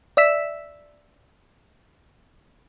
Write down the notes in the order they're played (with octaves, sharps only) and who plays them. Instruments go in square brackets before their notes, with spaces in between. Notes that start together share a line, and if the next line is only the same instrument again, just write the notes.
[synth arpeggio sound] D5 E5 E6 B6 E7